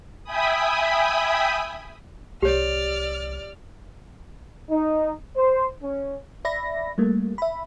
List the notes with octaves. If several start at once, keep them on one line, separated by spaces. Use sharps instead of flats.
E5 G5 G#5 B5 D#6
C2 G4 C#5 D5 F6
D#4
C5
C#4
D5 E5 B5 A#6
G3 A3 A#3
E5 B5